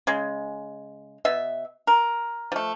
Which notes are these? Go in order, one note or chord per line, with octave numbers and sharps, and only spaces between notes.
C#3 G#3
B2 E5
A#4
F3 A3